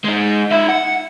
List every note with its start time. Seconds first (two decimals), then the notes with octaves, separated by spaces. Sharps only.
0.05 G#3 D#4
0.51 D#4 E5
0.69 F#5